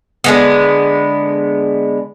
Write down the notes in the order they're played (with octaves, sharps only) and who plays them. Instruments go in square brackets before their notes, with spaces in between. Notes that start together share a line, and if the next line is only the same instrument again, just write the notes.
[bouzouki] D3 G#3 B3